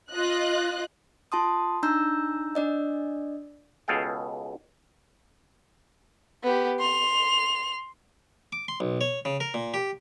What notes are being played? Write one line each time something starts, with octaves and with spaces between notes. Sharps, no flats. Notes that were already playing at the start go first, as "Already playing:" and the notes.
F4 D#5 F#6
F4 A5 C6 D#6
D4 D#4 A#5 E6 G6
D4 D5 D#5
C#2 B2 G#4 A4 F5 G5
B3 G4
C6 F7
D6
C6
B1
C#5
C#3
A#4
A#2
G4